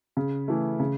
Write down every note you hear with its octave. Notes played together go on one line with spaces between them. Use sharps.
C#3
E3 A3
C#3